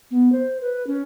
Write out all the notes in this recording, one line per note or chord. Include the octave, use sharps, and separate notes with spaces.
B3
C5
B4
C#4